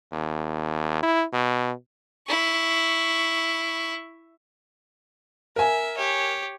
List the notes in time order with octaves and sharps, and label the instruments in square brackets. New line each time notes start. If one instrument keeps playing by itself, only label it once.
[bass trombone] D#2
E4
B2
[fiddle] E4 C#6
[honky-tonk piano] A#4 G#5 [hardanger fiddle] E5
[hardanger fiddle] G4 C#5